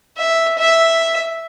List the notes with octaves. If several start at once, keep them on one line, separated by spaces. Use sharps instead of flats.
E5
E5